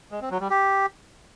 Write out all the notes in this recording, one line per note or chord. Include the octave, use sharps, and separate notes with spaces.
G#3
C4
F#3
G3
G4